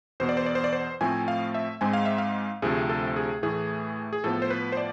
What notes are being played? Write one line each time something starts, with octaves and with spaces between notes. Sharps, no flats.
E2 B2 B3 C5
D5
C5
D5
C5
D5
C5
A2 F3 A3 C4 G#5
F5
E5
G#2 G#3 C4 G#5
F5
E5
F5
D2 C3 F3 A3 C4 G#4
A4
G#4
A2 E3 A3 G#4
G#4
A2 F3 B3 A4
C5
B4
C5
D5